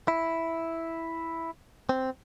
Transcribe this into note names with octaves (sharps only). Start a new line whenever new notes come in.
E4
C4